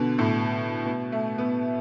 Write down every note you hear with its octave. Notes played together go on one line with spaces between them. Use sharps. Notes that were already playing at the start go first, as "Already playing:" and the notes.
Already playing: B2 D3
A2
B2
A3
B3